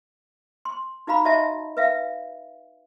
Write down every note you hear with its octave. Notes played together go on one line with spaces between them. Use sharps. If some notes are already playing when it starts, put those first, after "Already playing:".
C6
D#4 F#4 F5 A#5 B5
F#4 C#5 D#5 E5 A5
B4 E5 F5